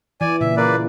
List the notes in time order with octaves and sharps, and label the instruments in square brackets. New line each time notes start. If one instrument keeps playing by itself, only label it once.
[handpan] E3 [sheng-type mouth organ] D5 G#5
[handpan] A#2 C#3 [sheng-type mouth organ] E5
[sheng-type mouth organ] A#3 B4 D5